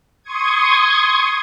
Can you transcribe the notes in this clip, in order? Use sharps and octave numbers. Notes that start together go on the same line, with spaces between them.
C6 C#6 D#6 G#6